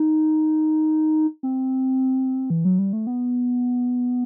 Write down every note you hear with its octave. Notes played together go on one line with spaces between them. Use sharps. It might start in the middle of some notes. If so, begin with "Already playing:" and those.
Already playing: D#4
C4
E3
F#3
G3
A3
B3